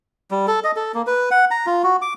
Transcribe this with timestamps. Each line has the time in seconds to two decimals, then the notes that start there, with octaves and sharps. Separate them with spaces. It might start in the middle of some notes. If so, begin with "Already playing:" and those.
0.31 G3
0.47 A4
0.64 D#5
0.76 A4
0.94 A#3
1.07 B4
1.31 F#5
1.51 A#5
1.66 F4
1.83 F#4
2.02 D6